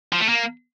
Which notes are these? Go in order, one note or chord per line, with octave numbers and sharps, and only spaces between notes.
F3
A3
A#3